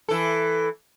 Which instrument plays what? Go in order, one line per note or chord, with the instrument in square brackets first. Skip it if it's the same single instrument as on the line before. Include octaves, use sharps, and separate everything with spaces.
[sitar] E3 A4